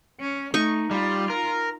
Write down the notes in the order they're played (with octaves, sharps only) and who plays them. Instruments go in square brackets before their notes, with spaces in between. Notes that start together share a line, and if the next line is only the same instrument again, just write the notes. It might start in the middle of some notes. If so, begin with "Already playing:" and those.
[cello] C#4
[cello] A3 [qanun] D#4 C#6
[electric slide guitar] G3 [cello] F4
[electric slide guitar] A#4